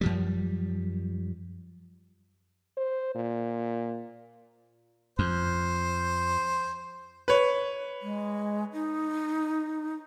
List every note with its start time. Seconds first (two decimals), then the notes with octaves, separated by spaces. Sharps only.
0.01 F#2 F3 G3
2.78 C5
3.15 A#2
5.19 F2 C5
7.28 B4 C#5
8.02 G#3
8.72 D#4